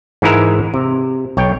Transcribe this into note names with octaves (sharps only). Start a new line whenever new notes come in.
G#2 E3 G#3 E4 A#4 E5
C3
B1 C#5 G5